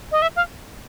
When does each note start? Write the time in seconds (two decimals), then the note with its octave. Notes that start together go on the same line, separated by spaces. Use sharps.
0.12 D#5
0.22 E5
0.36 F5